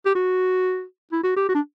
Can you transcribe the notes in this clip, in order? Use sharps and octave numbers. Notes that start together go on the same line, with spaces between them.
G4
F#4
E4
F#4
G4
F#4
D4